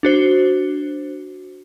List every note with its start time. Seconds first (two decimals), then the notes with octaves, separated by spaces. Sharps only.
0.03 D4 F#4 C5